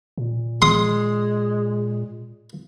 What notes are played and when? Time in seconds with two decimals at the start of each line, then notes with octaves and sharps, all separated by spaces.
0.18 A#2
0.62 G#3 C6 D#6